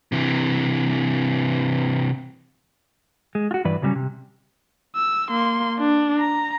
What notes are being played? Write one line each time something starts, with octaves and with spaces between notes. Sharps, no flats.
C3 E3
G#3
F4 F#4
G2 E3 B4 D5
C#3 F#3 G3 B3 C#4
C3
E6
A#3 C6
D4
A#5